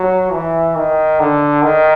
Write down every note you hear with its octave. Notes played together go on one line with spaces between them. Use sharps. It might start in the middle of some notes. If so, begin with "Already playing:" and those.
Already playing: F#3
E3
D#3
D3
D#3